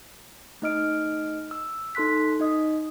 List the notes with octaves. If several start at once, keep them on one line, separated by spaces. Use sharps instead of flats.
A3 D#4 D#5 F6 D7
E6
D#4 A4 C6 F#6 B6
D#4 D#5 D#6